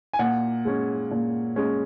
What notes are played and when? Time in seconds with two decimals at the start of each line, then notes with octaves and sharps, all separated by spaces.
0.13 G#5
0.19 A#2 F#5
0.65 G#3 C#4
1.11 A#2
1.56 G#3 C#4